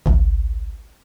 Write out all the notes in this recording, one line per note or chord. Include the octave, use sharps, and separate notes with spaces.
G#1 C#2